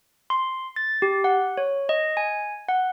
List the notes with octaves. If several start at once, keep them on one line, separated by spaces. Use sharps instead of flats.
C6
A6
G4
F#5
C#5
D#5
G#5
F#5